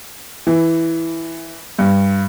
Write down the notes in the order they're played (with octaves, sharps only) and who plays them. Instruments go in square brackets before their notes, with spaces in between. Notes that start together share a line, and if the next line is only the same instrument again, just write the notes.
[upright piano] E3
G2